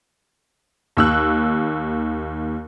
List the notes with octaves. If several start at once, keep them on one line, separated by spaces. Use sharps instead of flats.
D#2 E6 F#6